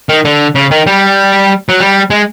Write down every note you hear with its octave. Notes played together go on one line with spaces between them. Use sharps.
D#3
D3
C#3
D#3
G3
F#3
G3
G#3